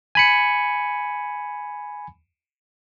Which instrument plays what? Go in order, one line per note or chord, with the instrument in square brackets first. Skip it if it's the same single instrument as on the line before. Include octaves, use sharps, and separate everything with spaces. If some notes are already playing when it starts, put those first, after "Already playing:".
[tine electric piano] G#5 B5 C#7